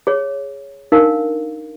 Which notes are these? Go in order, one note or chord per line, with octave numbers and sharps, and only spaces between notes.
G#4 C#5
D4 D#4 A#4 F5